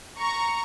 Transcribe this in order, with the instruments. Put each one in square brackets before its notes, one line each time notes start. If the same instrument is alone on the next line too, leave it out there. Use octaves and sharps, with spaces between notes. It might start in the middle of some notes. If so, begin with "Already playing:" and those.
[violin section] A#5 C#6